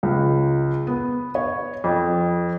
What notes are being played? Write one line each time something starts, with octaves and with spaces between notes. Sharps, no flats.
C#2
B3
C#5
F2